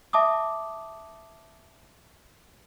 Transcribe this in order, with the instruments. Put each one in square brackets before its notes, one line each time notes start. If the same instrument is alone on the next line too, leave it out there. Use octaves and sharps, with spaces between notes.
[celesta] E5 A5 D6 D#6